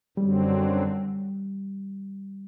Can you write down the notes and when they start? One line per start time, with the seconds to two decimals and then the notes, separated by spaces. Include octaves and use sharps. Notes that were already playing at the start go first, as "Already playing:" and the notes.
0.17 F#2 D3 F#3 G3 C4